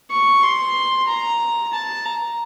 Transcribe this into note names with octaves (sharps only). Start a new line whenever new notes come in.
C#6
C6
A#5
A5
A#5